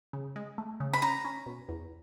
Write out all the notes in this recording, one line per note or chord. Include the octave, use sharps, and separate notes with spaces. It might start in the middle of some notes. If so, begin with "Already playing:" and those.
C#3
G#3
A3
C#3
B5
C#4 A#5
C#4
B2
E2